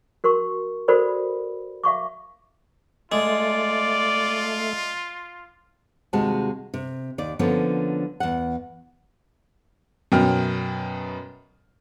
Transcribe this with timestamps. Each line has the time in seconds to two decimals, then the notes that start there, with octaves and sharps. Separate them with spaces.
0.24 F#4 A#4 C6 C#6
0.88 F#4 A4 A#4 C5 D5 B5
1.84 E5 F5 C#6 D6
3.12 G#3 A3 F4 D5
6.13 D#2 C3 G#3 F#4 A5
6.74 C3
7.18 D#2 D5
7.39 D3 F3 A#3 B3 C#4
8.20 E2 F#5
10.12 F#2 B2 G5 F6